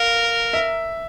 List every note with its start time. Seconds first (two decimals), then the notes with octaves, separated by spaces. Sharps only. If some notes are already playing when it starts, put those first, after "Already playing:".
Already playing: A#4 F5
0.53 E5